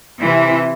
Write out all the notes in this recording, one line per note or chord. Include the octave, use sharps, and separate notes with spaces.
C3 E3